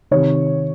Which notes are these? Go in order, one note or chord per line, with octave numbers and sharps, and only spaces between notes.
C3 D#3 C#5